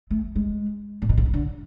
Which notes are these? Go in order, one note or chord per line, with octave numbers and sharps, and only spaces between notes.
A3
G#3
A#2
B2
C3
C#3
D3